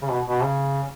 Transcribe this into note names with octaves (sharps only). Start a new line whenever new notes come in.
C#3
B2
B2
C#3